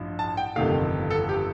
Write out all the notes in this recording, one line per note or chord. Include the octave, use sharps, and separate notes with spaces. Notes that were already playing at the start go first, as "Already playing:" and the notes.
Already playing: A1 G2 F3
A5
G5
G1 F2 C3 D#3 A3 F5
A4
G4